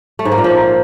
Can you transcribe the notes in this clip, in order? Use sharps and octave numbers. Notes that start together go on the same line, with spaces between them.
A3
G#2
A#3
A#2
F3